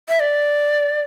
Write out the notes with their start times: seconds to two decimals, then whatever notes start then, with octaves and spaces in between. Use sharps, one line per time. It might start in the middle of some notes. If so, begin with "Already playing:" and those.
0.09 E5
0.20 D5